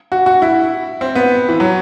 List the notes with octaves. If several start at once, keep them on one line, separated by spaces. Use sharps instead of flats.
F#4
F#4
E4
C4
B3
E3
F#3